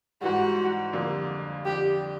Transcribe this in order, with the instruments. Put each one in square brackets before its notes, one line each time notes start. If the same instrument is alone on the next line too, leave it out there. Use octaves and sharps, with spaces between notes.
[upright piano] G#2 E3 G3 [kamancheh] F#4
[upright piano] F2 D3 G3 A#3
[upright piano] F2 D3 G3 [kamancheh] G4